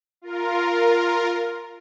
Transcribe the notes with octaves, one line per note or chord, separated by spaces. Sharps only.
F4 A#4